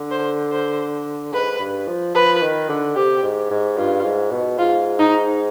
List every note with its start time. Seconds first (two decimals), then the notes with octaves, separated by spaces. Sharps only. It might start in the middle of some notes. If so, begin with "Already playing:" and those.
Already playing: D3
0.11 C5
0.51 C5
1.33 G#2 B4
1.59 G2
1.88 F3
2.14 F3 B4
2.42 D#3
2.69 D3
2.95 C3 G4
3.23 G#2
3.50 G#2
3.77 G2 F4
4.04 G#2
4.31 B2
4.58 G#2 F4
4.99 D#4